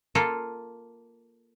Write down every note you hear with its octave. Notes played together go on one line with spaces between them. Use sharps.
A#3 F4 A4